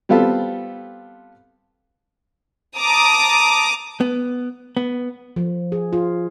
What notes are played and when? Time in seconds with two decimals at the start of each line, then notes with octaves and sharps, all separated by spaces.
0.09 G3 B3 C4 F4 A4
2.78 A5 A#5 D6 D#6
4.01 B3
4.77 B3
5.36 F3
5.72 G#4
5.93 F4